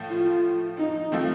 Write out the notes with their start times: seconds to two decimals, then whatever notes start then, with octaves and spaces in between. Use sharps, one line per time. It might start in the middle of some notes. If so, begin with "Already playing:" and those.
Already playing: A2 F3 A3
0.10 F4
0.78 D#4
1.12 F3 A3 C4